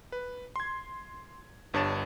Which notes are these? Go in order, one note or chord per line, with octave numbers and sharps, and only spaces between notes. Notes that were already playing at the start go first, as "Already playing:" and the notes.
B4
C6 G#6
G1 G2 C#5 A5 A6 E7